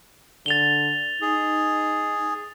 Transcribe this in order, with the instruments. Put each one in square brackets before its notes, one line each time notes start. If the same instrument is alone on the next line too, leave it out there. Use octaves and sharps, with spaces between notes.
[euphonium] D3 [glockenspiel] A6 F7 G7
[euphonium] D#4 [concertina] G#4